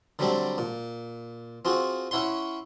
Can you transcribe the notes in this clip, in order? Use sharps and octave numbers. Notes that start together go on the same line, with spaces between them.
D3 F#3 G3 C4 D4
A#2
C4 F4 F#4 G#4
C#4 E4 C#5 F#5 C6